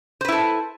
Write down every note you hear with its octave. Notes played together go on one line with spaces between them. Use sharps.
E4 A4 B4 C5